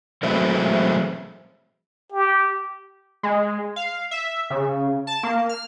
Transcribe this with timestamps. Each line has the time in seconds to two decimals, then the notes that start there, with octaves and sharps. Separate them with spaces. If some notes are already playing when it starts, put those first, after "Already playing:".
0.23 E3 F#3 G#3 A3 C4 E4
2.12 G4
3.23 G#3
3.76 F5
4.11 E5
4.50 C#3
5.07 A5
5.23 A#3
5.49 F6